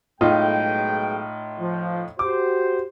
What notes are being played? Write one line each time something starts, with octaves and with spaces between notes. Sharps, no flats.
B1 A2 G#3 D#4 F4 G5
F3
F#4 G4 C5 D6